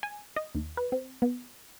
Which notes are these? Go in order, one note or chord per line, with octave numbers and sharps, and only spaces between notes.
G#5
D#5
D#2
B4
C4
B3